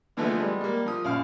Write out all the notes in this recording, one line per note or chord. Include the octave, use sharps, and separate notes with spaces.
D3 E3 F3 G#3 A3 B3
G3 G#3
G3 A#3
F3 D#6
A#1 F#2 F5 F6